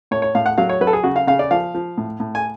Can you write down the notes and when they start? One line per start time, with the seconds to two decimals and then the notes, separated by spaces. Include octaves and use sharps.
0.11 A2 C#5
0.22 C#5
0.35 A2 F5
0.46 F#5
0.58 F#3 F5
0.69 C#5
0.81 F#3 B4
0.87 A4
0.93 G#4
1.04 C#3 F#4
1.16 F5
1.27 C#3 F5
1.39 D5
1.51 F3 F5
1.75 F3
1.98 A2
2.20 A2
2.35 G#5